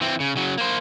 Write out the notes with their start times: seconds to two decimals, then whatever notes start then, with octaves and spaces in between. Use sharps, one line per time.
0.01 E3 C4
0.20 C#3
0.36 C#3 F#3
0.58 A#3 C5